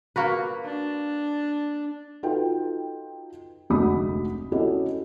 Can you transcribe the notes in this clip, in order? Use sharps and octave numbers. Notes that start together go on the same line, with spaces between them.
A#3 F#4 B4
D4
D#4 F4 F#4 A4 B4 G5
F1 D2 G#3 F#4 B5 D#6
C#4 E4 F#4 G4 A4 D#5